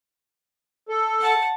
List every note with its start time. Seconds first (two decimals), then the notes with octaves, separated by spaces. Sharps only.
0.89 A4
1.20 F#5 A5